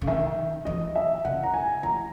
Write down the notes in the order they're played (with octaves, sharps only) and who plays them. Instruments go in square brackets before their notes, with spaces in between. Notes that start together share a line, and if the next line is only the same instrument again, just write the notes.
[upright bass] C#3
[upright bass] D#3 [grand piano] E5
[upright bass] E3 [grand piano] D#5
[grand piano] E5
[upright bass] C#3 [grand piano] F#5
[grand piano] A#5
G#5
[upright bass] E3 [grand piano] A#5